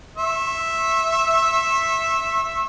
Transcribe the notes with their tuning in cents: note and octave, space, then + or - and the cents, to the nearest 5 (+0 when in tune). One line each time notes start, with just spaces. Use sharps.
E5 +0 C#6 -40